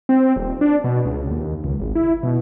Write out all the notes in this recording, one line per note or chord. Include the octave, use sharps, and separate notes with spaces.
C4
D#1
D4
B2
C#2
D#2
C#2
G#1
E4
B2